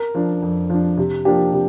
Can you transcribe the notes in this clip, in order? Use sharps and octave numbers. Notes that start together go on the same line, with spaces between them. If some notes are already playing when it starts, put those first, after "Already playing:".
Already playing: A#4
F3 D4
F2
F3 D4
C3
F3 A#3 D4 G4
C3